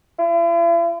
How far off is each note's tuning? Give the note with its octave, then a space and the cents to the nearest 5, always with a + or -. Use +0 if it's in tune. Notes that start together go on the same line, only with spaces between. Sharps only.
E4 +45